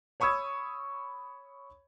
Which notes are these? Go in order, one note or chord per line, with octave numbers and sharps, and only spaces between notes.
C#5 B5 C#6 D#6 E6 G#6